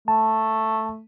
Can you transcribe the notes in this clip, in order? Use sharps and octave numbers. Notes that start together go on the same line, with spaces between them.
A3 A5